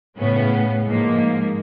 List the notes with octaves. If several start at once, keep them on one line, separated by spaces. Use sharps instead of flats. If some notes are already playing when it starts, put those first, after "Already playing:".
A2 C#3 B3 C#4
G#2 F3 A#3